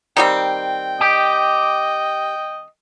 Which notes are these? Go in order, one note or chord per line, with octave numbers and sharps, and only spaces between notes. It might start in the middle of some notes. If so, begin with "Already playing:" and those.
D#3 G3 C4 G5
G4 D#5